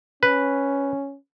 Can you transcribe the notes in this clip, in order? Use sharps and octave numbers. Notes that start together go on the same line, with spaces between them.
C#4 B4